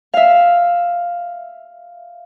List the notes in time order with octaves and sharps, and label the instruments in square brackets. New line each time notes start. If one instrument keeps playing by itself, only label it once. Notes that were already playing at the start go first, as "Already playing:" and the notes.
[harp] E5 F5